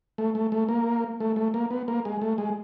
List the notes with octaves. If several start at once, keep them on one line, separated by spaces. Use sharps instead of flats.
A3
A3
A3
A#3
A3
A3
A#3
B3
A#3
G#3
A3
G#3